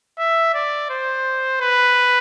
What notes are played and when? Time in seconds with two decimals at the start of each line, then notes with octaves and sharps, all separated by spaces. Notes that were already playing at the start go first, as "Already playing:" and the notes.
0.19 E5
0.54 D5
0.90 C5
1.61 B4